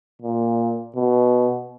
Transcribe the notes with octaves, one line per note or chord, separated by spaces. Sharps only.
A#2
B2